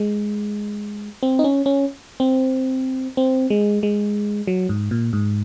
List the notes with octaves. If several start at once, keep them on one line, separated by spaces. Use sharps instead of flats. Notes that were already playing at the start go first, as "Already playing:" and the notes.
Already playing: G#3
C4
D#4
C#4
C#4
C4
C4
G#3
G#3
F#3
G#2
A#2
G#2